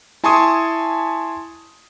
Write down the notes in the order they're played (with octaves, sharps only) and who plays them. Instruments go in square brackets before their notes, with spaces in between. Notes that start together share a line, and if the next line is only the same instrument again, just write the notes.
[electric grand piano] E4 G#5 A5 C6 C#6 D#6